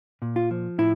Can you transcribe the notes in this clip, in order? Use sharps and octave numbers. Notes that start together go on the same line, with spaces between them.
A#2
F4
F3
A2 E4